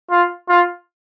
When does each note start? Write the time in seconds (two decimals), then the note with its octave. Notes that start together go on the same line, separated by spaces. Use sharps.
0.10 F4
0.49 F4